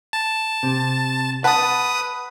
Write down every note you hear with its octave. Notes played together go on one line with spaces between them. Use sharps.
A5
C3
B4 F#5 A5 D#6